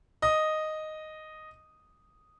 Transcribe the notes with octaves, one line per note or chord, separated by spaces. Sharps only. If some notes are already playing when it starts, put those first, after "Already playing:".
D#5 D#6